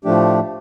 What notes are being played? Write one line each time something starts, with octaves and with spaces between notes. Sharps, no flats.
A2 F3 A3 D4 G4